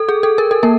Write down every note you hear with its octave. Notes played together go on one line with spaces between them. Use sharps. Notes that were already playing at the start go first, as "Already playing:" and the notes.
Already playing: A4
G#4
A4
A#4
A4
A#3 A#4